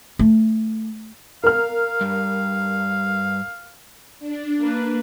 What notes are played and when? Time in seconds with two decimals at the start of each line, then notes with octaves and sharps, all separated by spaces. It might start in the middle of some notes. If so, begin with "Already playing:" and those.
0.19 A3
1.44 A#4 F5 F6
2.01 G2
4.19 D4
4.59 A#3 B4